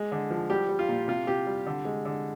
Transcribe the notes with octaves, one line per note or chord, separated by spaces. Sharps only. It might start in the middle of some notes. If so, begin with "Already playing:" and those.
Already playing: G#3
D3
F3
G3 G4
G3
F4
A#2
C3 F4
C3 G4
G3
D3
G#3
D3